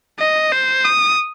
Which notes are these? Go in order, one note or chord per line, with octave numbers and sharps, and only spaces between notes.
D#5
C5
D#6